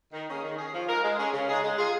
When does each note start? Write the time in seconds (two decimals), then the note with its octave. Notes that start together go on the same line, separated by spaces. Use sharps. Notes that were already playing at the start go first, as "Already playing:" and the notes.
0.13 D#3
0.29 A#3 C#4 G#4
0.43 D#3
0.58 C#4 G#4
0.73 F3
0.89 G#3 D#4 A#4
1.03 G#3
1.18 C#4 G#4
1.33 C#3
1.49 G#3 D#4 G#4
1.63 G#3
1.78 F4 G#4